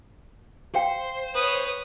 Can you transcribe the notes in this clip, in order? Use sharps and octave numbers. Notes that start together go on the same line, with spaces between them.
C5 F5 G5
B4 C#5 D#6